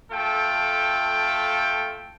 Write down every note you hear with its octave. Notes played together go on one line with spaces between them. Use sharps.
A3 F4 A4 G5